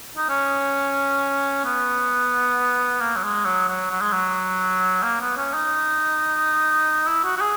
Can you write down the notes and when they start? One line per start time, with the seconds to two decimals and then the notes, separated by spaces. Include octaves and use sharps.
0.17 D#4
0.29 C#4
1.65 B3
3.01 A#3
3.16 F#3
3.23 G#3
3.45 F#3
3.68 F#3
3.91 F#3
4.01 G#3
4.13 F#3
5.03 A#3
5.21 B3
5.37 C#4
5.54 D#4
7.07 E4
7.24 F#4
7.37 F#4
7.41 G#4